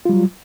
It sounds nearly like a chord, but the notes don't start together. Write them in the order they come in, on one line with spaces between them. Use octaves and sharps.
F4 G3 F#3